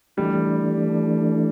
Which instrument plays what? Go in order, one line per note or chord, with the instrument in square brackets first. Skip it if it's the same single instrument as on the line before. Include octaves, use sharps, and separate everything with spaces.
[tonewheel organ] E3 A3 D4 [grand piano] G3